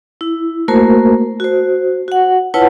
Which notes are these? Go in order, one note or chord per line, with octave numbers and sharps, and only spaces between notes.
E4
A3 A#3 F#4 A#4 C5
F#4 C5
F#4 F#5
E4 F4 B4 C#5 F#5 A5